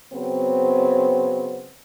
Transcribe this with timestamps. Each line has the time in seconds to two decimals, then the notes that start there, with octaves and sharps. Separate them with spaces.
0.13 C#3 F#3 B3 C4